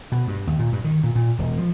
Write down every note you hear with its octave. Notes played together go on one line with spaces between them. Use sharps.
B2
G2
D#2
A#2
G2
D#3
A#2
A#2
E1
F3